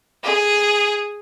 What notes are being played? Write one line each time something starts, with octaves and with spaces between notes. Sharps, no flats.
G#4